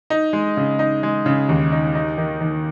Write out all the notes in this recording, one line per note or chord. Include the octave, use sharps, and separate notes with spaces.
D#4
G#3
C#3
D#4
G#3
C#3
D#2
D#4
D#4
D#3
D#3